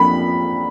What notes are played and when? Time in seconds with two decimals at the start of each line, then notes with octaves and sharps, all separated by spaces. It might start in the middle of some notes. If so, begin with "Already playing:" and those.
Already playing: F2 F3 A#3 D4 B5